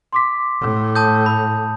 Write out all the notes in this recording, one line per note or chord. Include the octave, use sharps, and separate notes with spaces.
C6 D6 B6
A2
A5 D#6 G6
B5